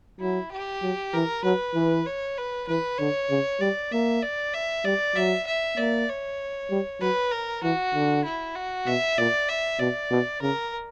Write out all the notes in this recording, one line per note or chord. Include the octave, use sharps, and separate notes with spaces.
F#3 E4
G4
F#3
E3 A#4
F#3 B4
E3
C#5
B4
E3 B4
D3 C#5
C#3
G3 D5
A#3 E5
D5
E5
G3 D5
F#3 E5
E5
A#3 D5
C#5
G3
F#3 B4
A#4
E3 F#4
D3
E4
F#4
B2 E5
A#2 D5
E5
B2 D5
B2
C#3 A#4